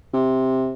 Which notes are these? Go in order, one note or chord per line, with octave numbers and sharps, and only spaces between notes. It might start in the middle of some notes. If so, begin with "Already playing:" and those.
C3